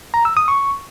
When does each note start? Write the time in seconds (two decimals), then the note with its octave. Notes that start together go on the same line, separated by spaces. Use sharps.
0.14 A#5
0.25 E6
0.37 D#6
0.48 C#6